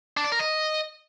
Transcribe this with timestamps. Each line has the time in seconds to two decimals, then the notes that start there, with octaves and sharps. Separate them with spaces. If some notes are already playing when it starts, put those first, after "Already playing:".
0.17 D4
0.24 D5
0.32 A#4
0.39 D#5